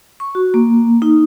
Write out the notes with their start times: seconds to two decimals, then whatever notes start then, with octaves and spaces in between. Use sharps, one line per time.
0.20 C#6
0.35 F#4
0.54 A#3
1.02 D#4